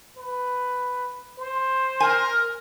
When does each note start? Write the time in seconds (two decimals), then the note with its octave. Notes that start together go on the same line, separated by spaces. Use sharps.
0.17 B4
1.38 C5
2.00 A#4 G#5